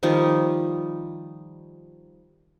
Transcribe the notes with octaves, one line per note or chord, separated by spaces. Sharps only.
D#3 F3 G3 D#4